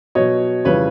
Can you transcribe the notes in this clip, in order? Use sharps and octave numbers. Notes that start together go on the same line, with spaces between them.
B2 F#3 C#5 D#5
F2 C#3 E3 G3 B4 C#5